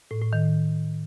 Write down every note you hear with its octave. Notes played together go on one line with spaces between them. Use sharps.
A2
A2
D#3